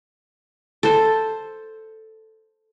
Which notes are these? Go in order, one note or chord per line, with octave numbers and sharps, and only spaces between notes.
A4 C5